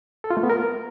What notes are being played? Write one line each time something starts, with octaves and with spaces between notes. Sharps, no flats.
A4
F4
A3
B3
A#4